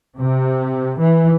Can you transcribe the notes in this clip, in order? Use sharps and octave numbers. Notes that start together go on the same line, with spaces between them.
C3
E3